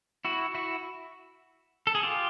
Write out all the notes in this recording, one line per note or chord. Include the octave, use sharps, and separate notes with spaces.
E4 F#4
E4 F#4
A4
G#4
F4 G4